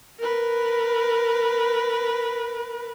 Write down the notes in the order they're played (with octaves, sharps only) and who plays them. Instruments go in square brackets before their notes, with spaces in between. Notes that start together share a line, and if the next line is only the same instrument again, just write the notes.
[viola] A#4 B4